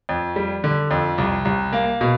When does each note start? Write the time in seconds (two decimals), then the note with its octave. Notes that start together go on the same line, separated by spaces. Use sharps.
0.09 F2
0.36 G3
0.64 D3
0.91 F2
1.18 C2
1.45 C2
1.73 A#3
2.01 B2